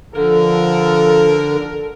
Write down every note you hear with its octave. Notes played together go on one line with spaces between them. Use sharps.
D3 F3 A4 A#4